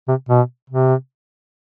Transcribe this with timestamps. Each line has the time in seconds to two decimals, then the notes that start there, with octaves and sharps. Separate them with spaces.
0.08 C3
0.29 B2
0.70 C3